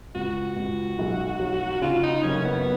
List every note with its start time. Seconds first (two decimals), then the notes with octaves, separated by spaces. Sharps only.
0.15 C#2 F#4
0.56 C#2
0.99 B1
1.40 F#3
1.81 C#3 F4
2.03 D#4
2.23 F#1 C#4
2.45 B3